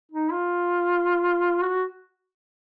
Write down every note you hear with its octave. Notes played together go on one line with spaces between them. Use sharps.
D#4
F4
F#4